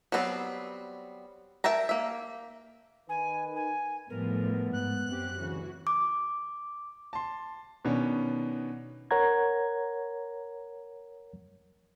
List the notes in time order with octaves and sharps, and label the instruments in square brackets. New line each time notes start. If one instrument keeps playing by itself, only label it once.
[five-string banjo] F#3 G3 B3 C4
A#4 E5 G5 A5 A#5
A#3 E5
[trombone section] D#3 B4 [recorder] G#5
[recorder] G#5
[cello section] A2 F3 G3 [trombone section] B3 [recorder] A#4
[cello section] G#2 [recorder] F#6
[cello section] F#2 C4 G4
[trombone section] D2 C#3 [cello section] E3 F#4
[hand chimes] D6
[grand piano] A5 C6
B2 D#3 B3 C#4 D4
[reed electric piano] A#4 C#5 F#5 A#5 G#6